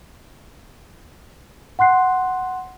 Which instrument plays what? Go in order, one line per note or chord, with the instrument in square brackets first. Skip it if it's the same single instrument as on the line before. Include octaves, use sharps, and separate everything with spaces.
[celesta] F#5 C6 F#6 C7